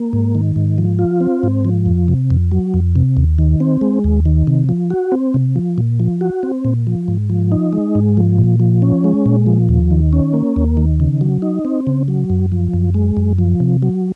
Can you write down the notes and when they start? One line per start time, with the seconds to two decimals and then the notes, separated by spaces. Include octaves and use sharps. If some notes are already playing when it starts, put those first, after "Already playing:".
Already playing: A#3
0.13 G#2
0.35 D#3
0.56 G#2
0.78 F3
0.99 F4
1.21 C4
1.43 G#2
1.65 F3
1.86 F2
2.08 C3
2.30 F2
2.51 F#3
2.74 F2
2.96 C3
3.17 D#2
3.38 D#3
3.60 C4
3.81 G#3
4.04 D#2
4.26 D#3
4.47 C3
4.69 F3
4.90 F#4
5.12 C4
5.34 C3
5.56 F3
5.78 A#2
6.00 F3
6.21 F#4
6.43 C4
6.65 A#2
6.87 F3
7.08 G#2
7.30 F3
7.52 D#4
7.73 G#3
7.95 G#2
8.17 F3
8.38 A#2
8.60 F3
8.82 C#4
9.04 G#3
9.26 A#2
9.47 F3
9.69 D#2
9.91 D#3
10.13 C#4
10.34 A#3
10.56 D#2
10.77 D#3
11.00 C#3
11.21 F#3
11.42 D#4
11.65 C4
11.87 C#3
12.08 F#3
12.30 F#2
12.52 F3
12.73 F#2
12.94 G#3
13.17 F#2
13.38 F3
13.60 C3
13.82 F#3